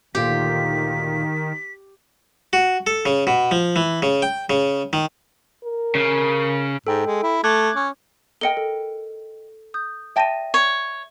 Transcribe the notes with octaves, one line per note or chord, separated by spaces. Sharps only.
D2 A#2 D#3 F4 G4 B6
F#4
A4
C#3
B2
F3
E3
C#3
G5
C#3
D#3
A#4
C#3
G#2 A4 G5
G#3
E4
A3 D6 F#6 G#6
C#4
A#4 D#5 G5 C#7 G7
A4
D#6 G6
D5 E5 G5 A5 A#6 D#7
C#5